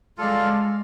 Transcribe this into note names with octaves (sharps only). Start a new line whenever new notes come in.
G#3 F4 A4 D5 F5